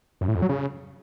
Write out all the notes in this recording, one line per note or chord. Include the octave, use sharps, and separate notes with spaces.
F#2
A2
F2
F#3
C#3